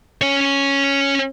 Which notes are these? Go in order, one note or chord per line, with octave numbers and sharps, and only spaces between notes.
C#4 C#5